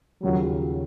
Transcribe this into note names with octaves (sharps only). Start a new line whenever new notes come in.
D#2 C#3 F3 F#3